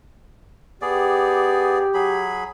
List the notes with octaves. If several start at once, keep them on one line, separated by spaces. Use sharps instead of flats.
B3 G4 G#4 D5
F#3 G#4 B5